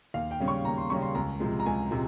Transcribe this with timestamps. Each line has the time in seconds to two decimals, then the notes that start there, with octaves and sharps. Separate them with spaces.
0.14 D#2 F5
0.31 G5
0.40 C#3 G3 C#4
0.48 C#6
0.65 D#2 A#5
0.77 C6
0.90 C#3 G3 C#4 C#6
1.02 C6
1.15 C#2 A#5
1.40 C3 F3 G#3
1.60 A#5
1.66 C#2 G#5
1.91 C3 F3 G#3